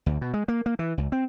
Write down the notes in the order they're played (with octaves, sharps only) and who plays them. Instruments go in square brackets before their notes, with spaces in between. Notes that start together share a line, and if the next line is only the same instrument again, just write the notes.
[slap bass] D2
B2
G#3
A#3
A#3
E3
C#2
C4